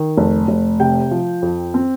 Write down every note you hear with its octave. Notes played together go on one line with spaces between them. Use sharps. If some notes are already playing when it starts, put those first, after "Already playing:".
Already playing: D#3
F1
F1
C3 G5
F3
F2
C4